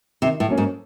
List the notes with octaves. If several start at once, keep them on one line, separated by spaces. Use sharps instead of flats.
C3 D#3
A2
F#3 A#3 C#4
G#2